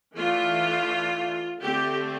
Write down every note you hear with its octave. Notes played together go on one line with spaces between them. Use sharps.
E3 A3 D4 F4
D3 A3 C4 G4